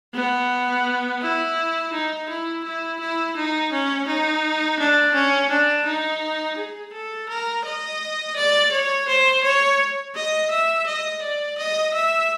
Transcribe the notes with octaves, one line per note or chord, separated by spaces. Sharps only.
B3
E4
D#4
E4
E4
E4
D#4
C#4
D#4
D4
C#4
D4
D#4
G#4
A4
A#4
D#5
D5
C#5
C5
C#5
D#5
E5
D#5
D5
D#5
E5